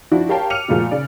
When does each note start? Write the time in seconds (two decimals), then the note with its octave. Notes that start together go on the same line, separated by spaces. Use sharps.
0.11 F3 D4 E4 F#4
0.29 G4 A#4 C#5 F5 G5 A5
0.50 D6 F6 C#7 D#7 F7
0.68 A#2 F3 G#3 A3 F#4
0.91 C#3 D5